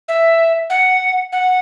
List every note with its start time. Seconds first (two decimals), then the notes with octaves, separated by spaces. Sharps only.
0.08 E5
0.70 F#5
1.32 F#5